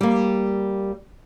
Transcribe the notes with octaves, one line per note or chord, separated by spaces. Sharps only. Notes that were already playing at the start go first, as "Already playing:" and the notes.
G3 A#3